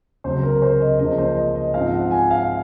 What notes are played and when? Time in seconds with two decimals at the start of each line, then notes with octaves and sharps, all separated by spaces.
0.24 C#2 C3 F#3 C5
0.43 A#4
0.62 C5
0.81 D#5
0.99 C#2 C#3 F3 A#3 D#5
1.18 C5
1.36 D#5
1.55 D#5
1.74 G#2 F3 C4 F4 F5
1.93 F#5
2.11 G#5
2.31 F5